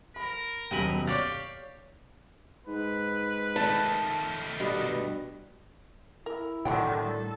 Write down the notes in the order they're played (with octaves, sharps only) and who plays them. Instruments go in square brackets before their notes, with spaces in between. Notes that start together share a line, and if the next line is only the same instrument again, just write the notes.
[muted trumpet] A#4 [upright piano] B5
[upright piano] D#1 F#2 B2 [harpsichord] G5 G#5 B5
[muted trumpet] G4 [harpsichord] C#5 D5 F5 [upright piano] A6
[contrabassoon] G#2 [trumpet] B4
[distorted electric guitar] D#3 A3 [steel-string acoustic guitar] A5
[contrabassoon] G2 [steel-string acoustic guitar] B2 [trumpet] B4
[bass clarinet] E4 [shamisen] A#4
[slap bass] A2 [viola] D3 D#3 [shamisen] F#3 F#5 G5
[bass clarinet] G3 [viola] A4